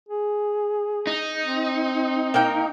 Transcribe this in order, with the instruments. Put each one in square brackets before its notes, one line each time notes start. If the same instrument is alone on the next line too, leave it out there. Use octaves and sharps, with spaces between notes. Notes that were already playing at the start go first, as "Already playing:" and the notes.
[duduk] G#4
[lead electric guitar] D#4
[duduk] C4
[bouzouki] A#3 A#4 G5